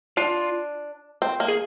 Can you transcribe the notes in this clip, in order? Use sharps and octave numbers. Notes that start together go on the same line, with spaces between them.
D4 F4
C4
A#3
G#4